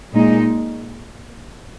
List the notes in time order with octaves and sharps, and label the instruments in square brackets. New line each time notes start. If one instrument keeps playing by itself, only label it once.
[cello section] A#2 G#3 D#4